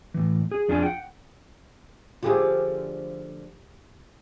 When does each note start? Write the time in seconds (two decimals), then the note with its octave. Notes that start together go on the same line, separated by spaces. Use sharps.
0.14 A2 E3
0.51 G#4
0.68 F2 D4 F4 G#4 G#5
0.82 F#5 G5
2.23 D3 F3 A3 F4 G4 G#4